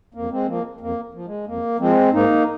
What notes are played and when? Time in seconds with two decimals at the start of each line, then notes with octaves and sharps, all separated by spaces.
0.14 F2 A#3
0.32 G#3 C4
0.47 F3 A#3
0.80 F2 A#3
1.14 F3
1.25 G#3
1.47 F2 A#3
1.80 F3 G#3 C4
2.13 G#2 A#3 D#4